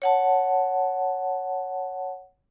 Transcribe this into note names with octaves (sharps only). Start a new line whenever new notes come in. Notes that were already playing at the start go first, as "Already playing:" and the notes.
C#5 F#5 A5